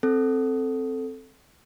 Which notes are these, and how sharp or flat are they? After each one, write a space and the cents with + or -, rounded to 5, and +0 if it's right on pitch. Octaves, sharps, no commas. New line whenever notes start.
C4 +0 A4 +0